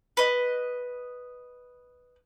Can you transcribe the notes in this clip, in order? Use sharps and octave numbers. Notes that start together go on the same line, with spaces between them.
B4 D#5